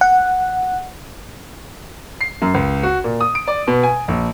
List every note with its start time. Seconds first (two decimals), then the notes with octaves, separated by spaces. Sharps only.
0.01 F#5
2.21 C7
2.42 F#2
2.54 C#2
2.83 F#4
3.04 A#2
3.21 D#6
3.35 D7
3.48 D5
3.68 B2
3.83 G#5
4.08 A#1